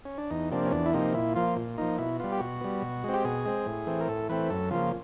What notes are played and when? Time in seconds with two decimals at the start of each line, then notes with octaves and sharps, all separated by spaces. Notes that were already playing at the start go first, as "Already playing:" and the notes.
0.05 C#4
0.18 D4
0.31 E2 D#4
0.52 C3 F3 A#3 D4
0.66 C#4
0.72 E2 D4
0.86 E4
0.94 C3 F3 A#3 D#4
1.14 A#2 E4
1.36 F3 A#3 F4
1.56 A#2
1.78 F3 A#3 D#4
1.98 B2 E4
2.20 G3 B3 F4
2.32 G4
2.40 B2 F#4
2.61 G3 B3
2.82 B2
3.04 G#3 C4
3.14 G4
3.25 B2 G#4
3.46 G#3 C4
3.66 A2
3.87 E3 A3 C4
4.00 A#4
4.08 A2 A4
4.29 E3 A3 C4 B4
4.50 F#2 A4
4.71 C#3 F3 A#3 F4